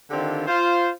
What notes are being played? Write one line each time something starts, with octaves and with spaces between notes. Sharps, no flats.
D3 D#3 C4 D4 F4 G4
F4 C5